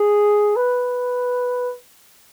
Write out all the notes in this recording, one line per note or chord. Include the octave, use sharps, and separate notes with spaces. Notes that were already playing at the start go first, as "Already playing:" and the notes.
Already playing: G#4
B4